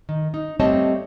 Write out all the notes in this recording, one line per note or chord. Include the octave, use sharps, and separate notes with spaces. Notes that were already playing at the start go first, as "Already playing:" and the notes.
D#3
D#4
G3 A3 C4 C#5 D#5 A5